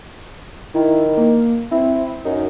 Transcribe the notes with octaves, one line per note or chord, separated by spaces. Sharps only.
D#3 E4
A#3
C4 E4
F#2 D#4